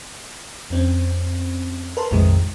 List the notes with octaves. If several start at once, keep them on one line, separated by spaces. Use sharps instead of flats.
F2 C4 C#4
A#4 B4 A5 C6
A#1 F2 A2 C3 D#3 G#3